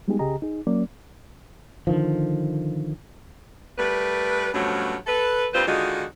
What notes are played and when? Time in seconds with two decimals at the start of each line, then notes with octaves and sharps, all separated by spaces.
0.08 G3 G#3 B3 D#4 G4 G#4
0.19 C2 C#3 G4 G#4 D#5 A#5
0.42 D#4 G#4
0.67 F#3 A#3 C#4 D5
1.87 D3 D#3 F3
3.78 G3 A3 A#4 B4
4.54 G2 B2 F3 F#3 A3 C#4
5.07 A4 B4
5.54 D2 G3 C4 F4 B4 C5
5.67 D3 D#3 G#3 D#4 F4 F#4